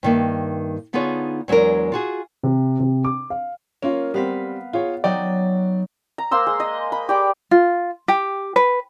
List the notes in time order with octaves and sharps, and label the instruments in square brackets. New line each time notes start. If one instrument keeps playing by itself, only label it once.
[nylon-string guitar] G2 D#3 A#3 E5
D3 B3 D#4 F4 G#4 C#5
E2 F#3 G#3 D4 A#4
F4 F#4 G#4
[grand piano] C3
C3
D6
F5
[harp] A#3 [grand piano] C#4 F4
[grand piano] G3 C4 [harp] B3 F5 B6
[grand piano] F4 G#4 C#5
[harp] F#3 D#4 [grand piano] D5 G5
[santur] A#5
A#3 C5 C6 E6
G#3
D#5
B5
G4 D5 D6
[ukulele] F4
G4
B4